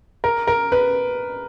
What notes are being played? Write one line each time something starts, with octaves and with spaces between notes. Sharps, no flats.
A#4
A#4
B4